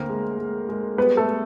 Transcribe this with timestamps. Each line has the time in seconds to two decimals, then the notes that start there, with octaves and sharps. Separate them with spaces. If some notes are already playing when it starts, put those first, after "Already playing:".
Already playing: D2 A#3 C4 A#4
0.09 G#3
0.39 G#3
0.69 G#3
0.98 G3 B3 B4
1.17 A3 A4